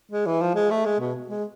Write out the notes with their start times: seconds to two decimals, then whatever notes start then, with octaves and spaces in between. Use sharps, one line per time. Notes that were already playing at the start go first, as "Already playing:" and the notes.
0.12 G#3
0.26 E3
0.41 F3
0.55 G#3
0.71 A3
0.85 G#3
1.00 B2
1.28 G#3